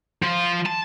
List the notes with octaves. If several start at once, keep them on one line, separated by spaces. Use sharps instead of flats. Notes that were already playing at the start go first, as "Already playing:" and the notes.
F3 F4
A5